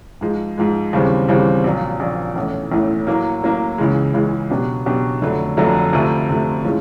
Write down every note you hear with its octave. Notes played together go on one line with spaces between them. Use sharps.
G#2 F3 G#3
G#2 F3 G#3
D#2 C#3 E3 G3 C4
D#2 C#3 E3 G3 C4
A#1 A#2 F#3
A#1 A#2 F#3
B1 A2 E3 A3 C#4
B1 A2 E3 A3 C#4
A2 F#3 A#3
A2 F#3 A#3
C#2 C#3 E3 G#3
C#2 C#3 E3 G#3
B2 F#3 B3 D4 G4
B2 F#3 B3 D4 G4
F1 F2 D3 F#3 A3
F1 F2 D3 F#3 A3
D2 C3 F3 A3
D2 C3 F3 A3
A2 F3 G#3 C#4